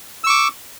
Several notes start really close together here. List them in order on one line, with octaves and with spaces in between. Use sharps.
E6 C#6 D6